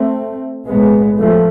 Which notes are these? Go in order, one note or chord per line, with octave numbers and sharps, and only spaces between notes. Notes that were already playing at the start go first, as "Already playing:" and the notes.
Already playing: A3 C4
B1 A2 G#3 B3
F3 A3